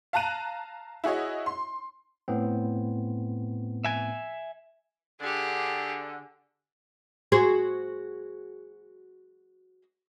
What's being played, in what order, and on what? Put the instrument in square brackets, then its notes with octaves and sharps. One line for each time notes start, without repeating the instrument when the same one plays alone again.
[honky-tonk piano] F5 A5 A#5 F#6 D#7
E4 F#4 G#4 C#5 D#5
C6
[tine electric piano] A2 B3 C4
[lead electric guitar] E5 G#5
[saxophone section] D3 [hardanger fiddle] G4 G#4
[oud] F#4 G#4 C5